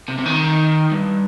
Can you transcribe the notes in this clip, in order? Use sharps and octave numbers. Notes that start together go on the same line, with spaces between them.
C3
C3
D#3
G2